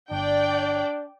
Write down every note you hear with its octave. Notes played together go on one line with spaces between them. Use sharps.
G1 D4 D5 G5